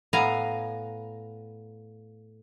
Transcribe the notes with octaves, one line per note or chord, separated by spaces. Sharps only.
A2 B3 F5 G#5 A#5